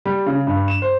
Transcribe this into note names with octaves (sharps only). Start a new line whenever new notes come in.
G3
C#3
G2
E7
C5